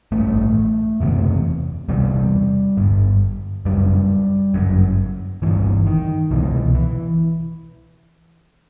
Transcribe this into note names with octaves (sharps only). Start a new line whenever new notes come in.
A1 G2 A3
F#1 E2 C3
E1 E2 C3 G3
G1 G2
F#1 F#2 G3
G1 F#2
G1 G2 E3
D#3
C2 B2 E3
E3